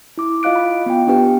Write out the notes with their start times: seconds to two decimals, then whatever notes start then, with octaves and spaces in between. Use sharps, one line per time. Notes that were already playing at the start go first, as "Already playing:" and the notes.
0.18 E4 D6
0.43 F4 D#5 F5 F#6 D7
0.56 B5
0.86 B3 F4 G5
1.07 B3 D4 G4 B4 G5